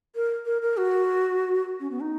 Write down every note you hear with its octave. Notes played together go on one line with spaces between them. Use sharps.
A#4
A#4
A#4
F#4
C#4
B3
D#4